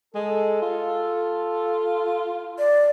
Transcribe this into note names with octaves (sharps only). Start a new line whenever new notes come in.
G#3 A4
F4
D5